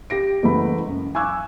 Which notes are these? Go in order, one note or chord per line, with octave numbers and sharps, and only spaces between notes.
G4 A#6 D7
F#1 E3 G#3 A3 B3 B5
F#2
G#5 C#6 D6 E6 F#6 G#6